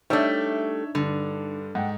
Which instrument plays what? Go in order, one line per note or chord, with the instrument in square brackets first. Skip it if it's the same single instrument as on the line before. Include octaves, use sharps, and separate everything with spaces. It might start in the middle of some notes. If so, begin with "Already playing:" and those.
[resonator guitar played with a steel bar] G3 A3 [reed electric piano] D4 D#4 [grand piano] C#5 E5 E6
[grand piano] G2 [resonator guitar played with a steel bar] D3
[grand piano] G#2 [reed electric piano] F#5 G5